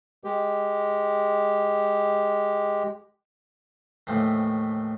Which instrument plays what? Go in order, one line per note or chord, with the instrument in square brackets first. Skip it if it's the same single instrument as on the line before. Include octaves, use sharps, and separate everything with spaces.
[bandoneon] G#3 G4
[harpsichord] D#2 A2 E3 F3 A3